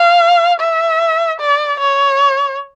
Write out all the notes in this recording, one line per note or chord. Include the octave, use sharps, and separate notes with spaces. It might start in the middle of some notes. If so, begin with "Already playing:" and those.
Already playing: F5
E5
D5
C#5